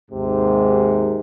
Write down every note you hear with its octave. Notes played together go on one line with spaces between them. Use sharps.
D#2 G#2 C3